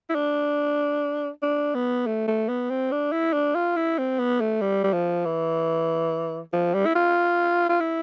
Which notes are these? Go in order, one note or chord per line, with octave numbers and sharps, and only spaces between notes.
E4
D4
D4
B3
A3
A3
B3
C4
D4
E4
D4
F4
E4
C4
B3
A3
G3
G3
F3
E3
F3
G3
E4
F4
F4
E4